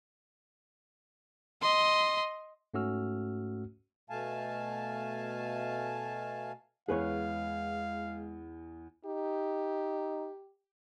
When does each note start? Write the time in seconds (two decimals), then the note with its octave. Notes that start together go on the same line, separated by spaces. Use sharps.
1.61 D#5 C6
2.74 G#2 A3 C#4 F#4 E6 F6
4.10 B2 A3 F5 G#5 A5
6.88 E2 G#3 G#4 B4 C#5 F5
9.05 D#4 G4